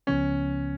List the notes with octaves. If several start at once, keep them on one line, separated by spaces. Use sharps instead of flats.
C#2 C#3 F3 B3 C#4